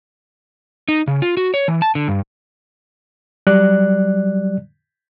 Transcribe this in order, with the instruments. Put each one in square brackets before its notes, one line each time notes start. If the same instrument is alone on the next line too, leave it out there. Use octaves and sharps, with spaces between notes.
[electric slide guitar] D#4
C#3
F4
F#4
C#5
E3
A5
D3
G2
[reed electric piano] F#3 G3 D5 F#6